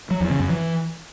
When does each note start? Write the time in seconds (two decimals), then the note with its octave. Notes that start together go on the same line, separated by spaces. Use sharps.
0.11 F#3
0.20 E2
0.30 C#3
0.40 F#2
0.49 E3